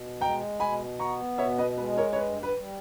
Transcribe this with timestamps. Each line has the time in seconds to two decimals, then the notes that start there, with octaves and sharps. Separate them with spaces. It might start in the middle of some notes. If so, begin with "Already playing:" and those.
Already playing: B2
0.21 G#3 G5 A#5
0.60 B2 G#5 B5
0.99 B3 A#5 C#6
1.38 B2 C#5 E5
1.58 B4 D#5
1.78 G#3 B4
1.97 A#4 C#5
2.13 C#5
2.16 G2 B4
2.43 B4
2.56 G3